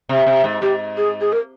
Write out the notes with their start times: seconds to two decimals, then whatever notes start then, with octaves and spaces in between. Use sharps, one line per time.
0.09 C3
0.26 C3
0.44 G#2
0.62 G#2 G4
0.97 G#4
1.21 G#4
1.33 A#4